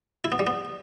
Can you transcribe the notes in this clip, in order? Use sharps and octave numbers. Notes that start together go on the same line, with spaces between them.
E4
B3
G3
B3